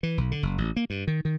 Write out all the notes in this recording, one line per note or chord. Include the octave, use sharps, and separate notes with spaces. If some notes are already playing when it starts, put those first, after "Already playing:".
E3
B1
D3
F#1
A1
A#3
G2
D#3
D#3